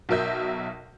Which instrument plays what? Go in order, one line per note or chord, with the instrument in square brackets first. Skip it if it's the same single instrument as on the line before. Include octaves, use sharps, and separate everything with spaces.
[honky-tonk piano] B1 B2 A#4 E5 G6